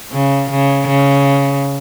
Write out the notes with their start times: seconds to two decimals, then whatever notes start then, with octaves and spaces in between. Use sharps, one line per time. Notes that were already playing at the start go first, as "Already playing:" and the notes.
0.12 C#3
0.50 C#3
0.88 C#3